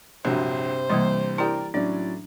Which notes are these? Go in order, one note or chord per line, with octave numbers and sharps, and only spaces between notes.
A#1 G2 C3 F#3 C5
C2 E3 G3 A#3
E4 G4 A#4 D5 G5
A2 F#3 C#4 D4 D5